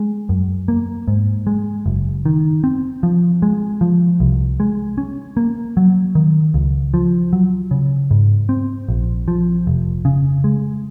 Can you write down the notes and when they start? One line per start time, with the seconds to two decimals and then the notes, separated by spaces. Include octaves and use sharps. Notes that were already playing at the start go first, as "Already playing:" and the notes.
Already playing: G#3
0.29 F#2
0.68 A#3
1.08 G#2
1.47 G#3
1.86 F#1
2.26 D#3
2.64 C4
3.03 F3
3.42 G#3
3.81 F3
4.20 C2
4.60 G#3
4.98 C#4
5.37 A#3
5.77 F#3
6.15 D#3
6.54 C#2
6.94 F3
7.33 F#3
7.71 C#3
8.11 G#2
8.49 C4
8.88 A#1
9.28 F3
9.67 F1
10.05 C#3
10.44 G#3